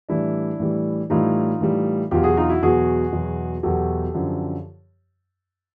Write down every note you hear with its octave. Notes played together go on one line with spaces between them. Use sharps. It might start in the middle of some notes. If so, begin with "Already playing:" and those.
A2 E3 G3 D4 E4
A2 E3 G3
A2 E3 G3 D#4 F4
A2 E3 G3
E2 B2 F#3 F4 G4
F#4 G#4
D#4 F4
E4 F#4
E2 B2 F#3 F#4 G#4
E2 B2 F#3
E2 B2 F#3 G4 A4
F#2 D3 F3